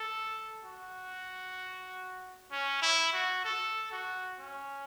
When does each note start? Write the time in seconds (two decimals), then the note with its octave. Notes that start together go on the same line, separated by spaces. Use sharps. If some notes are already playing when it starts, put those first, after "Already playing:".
Already playing: A4
0.63 F#4
2.52 C#4
2.82 E4
3.13 F#4
3.45 A4
3.92 F#4
4.39 C#4